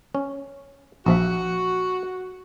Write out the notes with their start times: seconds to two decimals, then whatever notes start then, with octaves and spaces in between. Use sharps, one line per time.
0.15 C#4
1.06 A#1 F3 F#4 E5